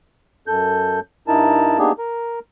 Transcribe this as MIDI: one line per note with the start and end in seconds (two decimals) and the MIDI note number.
0.47 1.00 42
0.47 1.00 69
0.47 1.00 91
1.28 1.78 43
1.28 1.78 63
1.28 1.78 64
1.28 1.78 70
1.28 1.78 81
1.79 1.92 58
1.79 1.92 59
1.79 1.92 62
1.79 1.92 63
1.79 1.92 67
1.79 1.92 68
1.99 2.39 70